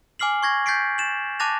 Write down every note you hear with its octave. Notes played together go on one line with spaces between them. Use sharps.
G#5 D6 F6 C7 F#7
C#6 G#6 A#6
G6 A6 B6 C7 D7
A6 E7 F#7
A5 D6 F#6 A6 A#6 F7